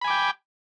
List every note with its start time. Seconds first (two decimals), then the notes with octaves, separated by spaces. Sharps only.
0.01 B5
0.04 G#5
0.07 D6
0.10 G5